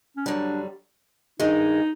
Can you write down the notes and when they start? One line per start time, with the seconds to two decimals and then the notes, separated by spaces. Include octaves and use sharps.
0.17 C#4
0.26 F#2 D3 G3 D4
1.40 G2 D#3 G#3 D#4